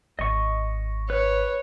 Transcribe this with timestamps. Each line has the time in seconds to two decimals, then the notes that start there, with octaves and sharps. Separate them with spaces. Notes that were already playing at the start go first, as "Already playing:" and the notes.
0.19 G#1 D#5 C#6
1.10 B4 C#5